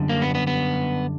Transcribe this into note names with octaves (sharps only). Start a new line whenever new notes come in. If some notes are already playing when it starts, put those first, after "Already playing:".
Already playing: F#2 D3 G3
A#3
B3
B3
B3